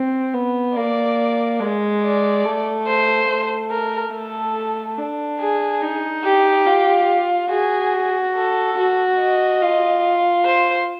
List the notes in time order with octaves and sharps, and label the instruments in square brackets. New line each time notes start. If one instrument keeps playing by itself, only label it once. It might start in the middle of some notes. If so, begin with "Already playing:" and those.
Already playing: [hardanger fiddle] C4
B3
[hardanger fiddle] A#3 [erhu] D5
[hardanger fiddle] G#3
[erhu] D5
[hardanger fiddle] A3
[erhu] C5
[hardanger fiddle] A3
[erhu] A#4
[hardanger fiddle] A3 [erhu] A4
[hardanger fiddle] D4
[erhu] G#4
[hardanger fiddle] D#4
[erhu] G4
[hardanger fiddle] F4
[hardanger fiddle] F#4 [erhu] G#4
[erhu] A4
[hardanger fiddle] F#4
[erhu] D#5
[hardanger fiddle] F4
[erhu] C5